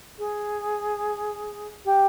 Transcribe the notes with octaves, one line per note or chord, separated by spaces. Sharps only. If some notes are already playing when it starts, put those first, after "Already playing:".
G#4
G4